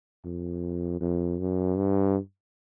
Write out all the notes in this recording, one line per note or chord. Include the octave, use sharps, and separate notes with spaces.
F2
F2
F#2
G2